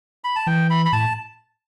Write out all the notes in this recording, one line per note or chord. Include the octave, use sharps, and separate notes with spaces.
B5
A5
E3 G5
B5
B5
A2 A5